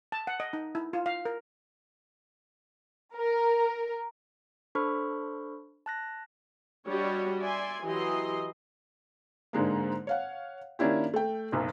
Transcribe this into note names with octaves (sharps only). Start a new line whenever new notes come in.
A5
F#5
D#5
D#4
E4
F4
F5
A#4
A#4
D4 A4 C5 B5 C#6 F6
A5 F#6 A#6
G3 D4 F#4 G4 C#5 D#5
D5 E5 G#5 C6
E3 F#3 G4 D#5 C6
G#2 D3 G#3 A#3
C#5 F5 F#5
D#3 A#3 C#4 D4 E4 G4
A3 G5
F#1 B1 F#2